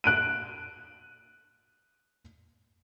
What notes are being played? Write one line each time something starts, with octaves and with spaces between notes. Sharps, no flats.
F#6 D7 D#7